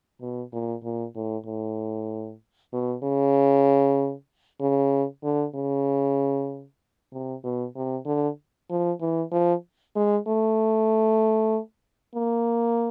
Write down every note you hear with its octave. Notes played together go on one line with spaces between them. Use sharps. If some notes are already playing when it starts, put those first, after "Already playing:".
B2
A#2
A#2
A2
A2
B2
C#3
C#3
D3
C#3
C3
B2
C3
D3
F3
E3
F3
G#3
A3
A#3